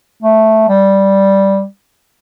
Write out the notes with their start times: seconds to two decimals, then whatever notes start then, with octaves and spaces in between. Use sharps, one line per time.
0.23 A3
0.69 G3